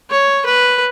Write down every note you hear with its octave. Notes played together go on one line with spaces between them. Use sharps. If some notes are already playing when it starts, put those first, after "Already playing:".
C#5
B4